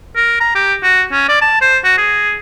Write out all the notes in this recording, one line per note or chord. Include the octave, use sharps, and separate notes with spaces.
A#4
A#5
G4
F#4
C#4
D5
A5
C5
F#4
G#4